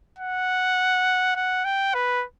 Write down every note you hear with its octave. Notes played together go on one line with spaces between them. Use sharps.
F#5
F#5
G5
B4